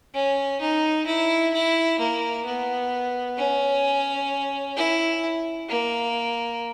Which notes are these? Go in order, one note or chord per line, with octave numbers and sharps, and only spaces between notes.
C#4
D#4
E4
E4
A#3
B3
C#4
E4
A#3